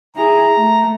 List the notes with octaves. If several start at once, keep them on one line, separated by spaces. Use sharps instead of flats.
E4 G#4 A#5
A3